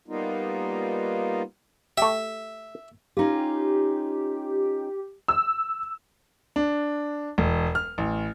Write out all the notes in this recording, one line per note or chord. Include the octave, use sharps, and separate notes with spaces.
G3 A#3 B3 D#4 F4
A3 G4 E5
C#4 D#4 F4 G4
E6
D4
E1
F6
A1